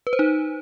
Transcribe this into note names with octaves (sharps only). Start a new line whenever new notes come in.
B4
C5
D#4